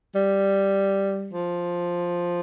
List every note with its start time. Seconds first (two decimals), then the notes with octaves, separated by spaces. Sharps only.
0.14 G3
1.33 F3